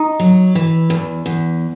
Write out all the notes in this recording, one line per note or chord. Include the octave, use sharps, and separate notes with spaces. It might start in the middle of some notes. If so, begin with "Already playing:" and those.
Already playing: D#4
F#3
E3
E2
E2